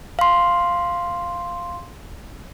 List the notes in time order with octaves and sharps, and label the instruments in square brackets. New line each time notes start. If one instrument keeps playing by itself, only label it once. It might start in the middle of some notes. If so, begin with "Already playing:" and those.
[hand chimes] F5 C6